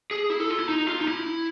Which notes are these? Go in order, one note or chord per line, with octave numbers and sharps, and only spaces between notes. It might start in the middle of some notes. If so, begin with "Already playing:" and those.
G#4
E4
A4
F4
E4
D#4
F4
D#4
E4